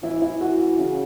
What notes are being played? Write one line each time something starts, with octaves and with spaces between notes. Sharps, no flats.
E3 E4
E4
F#4
F#4
C#3